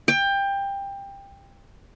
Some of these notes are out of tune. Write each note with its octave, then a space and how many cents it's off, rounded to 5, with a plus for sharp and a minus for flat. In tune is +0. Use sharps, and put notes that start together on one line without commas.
G5 +20